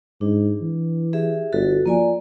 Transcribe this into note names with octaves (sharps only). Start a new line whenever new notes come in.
G#2 D4
E3
G4 G#4 E5
G1 F#4 A4
F3 A#3 D5 G#5